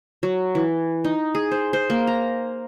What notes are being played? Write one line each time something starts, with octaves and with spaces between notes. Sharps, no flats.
F#3
E3
D#4
G#4
C5
C5
A#3
A#5